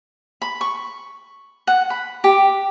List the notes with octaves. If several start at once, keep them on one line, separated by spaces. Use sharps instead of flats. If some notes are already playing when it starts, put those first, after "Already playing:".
B5
C#6
F#5
B5
G4